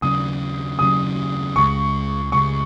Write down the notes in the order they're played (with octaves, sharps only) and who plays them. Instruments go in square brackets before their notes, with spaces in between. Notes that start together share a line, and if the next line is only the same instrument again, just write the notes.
[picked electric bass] D#2 C#3 F#3 C#4 [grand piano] D#6
[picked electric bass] D#2 C#3 F#3 C#4 [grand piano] D#6
[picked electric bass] C#2 C#3 G#3 [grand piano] C#6
[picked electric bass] C#2 C#3 G#3 [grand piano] C#6